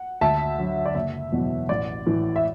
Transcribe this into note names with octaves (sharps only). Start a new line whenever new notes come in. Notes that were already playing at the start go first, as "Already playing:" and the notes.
Already playing: F#5
D2 E5 A5
D3 F#3
D5
F#1 E5
E2 B2 F#3
A1 D5
A2 E3
E5